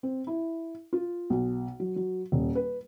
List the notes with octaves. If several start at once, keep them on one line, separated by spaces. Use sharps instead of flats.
C4
E4
F4
B1
F#3
F#3
D#1
B4